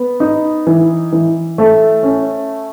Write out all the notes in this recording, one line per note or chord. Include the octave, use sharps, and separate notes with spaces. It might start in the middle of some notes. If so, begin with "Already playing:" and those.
Already playing: B3
D#4
E3
E3
A3
C#4